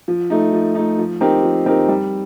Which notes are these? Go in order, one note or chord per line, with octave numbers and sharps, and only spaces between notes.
F3
A3 D#4
F3
A3 D#4
F3
C4 D#4 G4 A#4
F3
C4 D#4 G4 A#4
G3